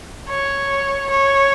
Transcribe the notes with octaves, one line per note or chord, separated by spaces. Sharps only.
C#5
C#5